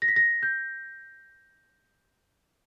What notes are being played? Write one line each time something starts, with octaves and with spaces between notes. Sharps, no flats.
A#6
B6
A#6
G6